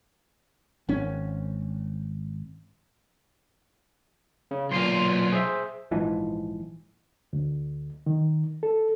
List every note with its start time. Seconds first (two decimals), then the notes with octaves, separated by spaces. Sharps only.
0.89 G#1 C#4
4.51 C#3
4.71 B1 A#2 F4 C6
5.32 G#4 C5 E5
5.91 A#1 G#2 E3 F3
7.33 D2
8.06 D#3
8.63 A4